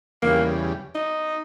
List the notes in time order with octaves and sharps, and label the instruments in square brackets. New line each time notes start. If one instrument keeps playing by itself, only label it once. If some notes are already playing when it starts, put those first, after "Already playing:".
[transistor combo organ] E2 C#3 G3 [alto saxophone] A#3
[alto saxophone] D#4